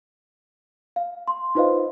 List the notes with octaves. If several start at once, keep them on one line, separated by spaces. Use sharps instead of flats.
F5
C6
D#4 F4 B4 C5 D#5 F5